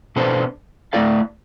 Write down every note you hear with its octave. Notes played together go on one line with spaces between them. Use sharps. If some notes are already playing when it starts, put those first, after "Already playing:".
B2 B3 D4 A4 C5
A3 E4 A4 D5 F5